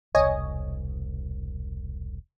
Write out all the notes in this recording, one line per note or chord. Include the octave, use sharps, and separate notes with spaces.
E1 C2 C#5 D#5 G#5